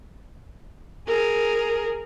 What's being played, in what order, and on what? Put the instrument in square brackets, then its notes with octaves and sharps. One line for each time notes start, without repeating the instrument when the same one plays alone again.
[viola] G#4 A#4